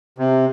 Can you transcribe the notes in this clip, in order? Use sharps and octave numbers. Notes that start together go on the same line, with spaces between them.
C3